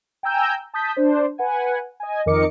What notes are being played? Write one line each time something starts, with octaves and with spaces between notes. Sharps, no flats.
G5 G#5 A#5 E6 G6
A5 D#6 G6 B6
D4 C5
B4 F#5 G#5
D#5 G#5
F2 D#3 A#4 D#5 D6 C#7